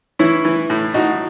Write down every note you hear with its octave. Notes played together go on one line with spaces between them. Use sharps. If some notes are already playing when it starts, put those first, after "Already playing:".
E3 C#4 E4
E3
A2
A2 D#4 F#4